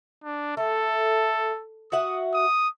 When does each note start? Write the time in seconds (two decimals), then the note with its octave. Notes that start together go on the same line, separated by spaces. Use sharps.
0.24 D4
0.57 A3 A4
1.92 F#4 E5 F#5 D#6
2.34 D#6